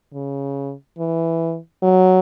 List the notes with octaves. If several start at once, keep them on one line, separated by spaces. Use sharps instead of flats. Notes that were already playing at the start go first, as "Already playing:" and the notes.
C#3
E3
F#3